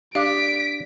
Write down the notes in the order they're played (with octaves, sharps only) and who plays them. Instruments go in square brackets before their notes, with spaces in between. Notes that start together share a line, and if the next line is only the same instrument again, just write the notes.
[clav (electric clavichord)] D4 [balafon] G4 F5 [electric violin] B6 D7